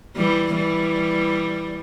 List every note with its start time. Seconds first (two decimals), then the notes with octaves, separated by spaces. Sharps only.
0.16 E3 G3
0.55 E3 G3